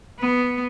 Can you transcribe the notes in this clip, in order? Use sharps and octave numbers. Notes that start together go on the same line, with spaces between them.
B3